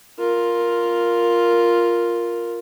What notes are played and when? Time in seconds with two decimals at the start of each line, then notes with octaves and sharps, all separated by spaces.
0.19 F4 A#4